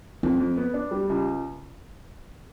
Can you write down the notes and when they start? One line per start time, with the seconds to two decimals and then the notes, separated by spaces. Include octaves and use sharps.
0.23 F2 C4
0.40 F2
0.57 B3
0.74 D4
0.91 G3
1.09 C#2